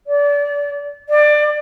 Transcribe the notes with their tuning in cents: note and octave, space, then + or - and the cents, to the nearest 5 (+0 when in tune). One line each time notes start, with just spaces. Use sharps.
D5 -30
D5 +20